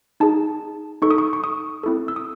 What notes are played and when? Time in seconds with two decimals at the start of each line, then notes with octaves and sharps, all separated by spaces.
0.20 D#4 G#4 A5
1.02 D#4 A4 C#6
1.11 D#6
1.18 C#6
1.33 C#6
1.44 D#6
1.83 C4 E4 A4
2.08 E6
2.16 D#6